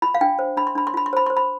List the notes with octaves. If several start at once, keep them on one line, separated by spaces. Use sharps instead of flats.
F4 B5
F5
D4 G5
C5
D4 B5
C6
D4 B5
C6
F4 B5
C6
C5 B5
C5 C6
B5